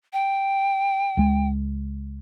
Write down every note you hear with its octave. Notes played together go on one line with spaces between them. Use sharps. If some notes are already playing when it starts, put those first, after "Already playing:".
G5
C#2 G#3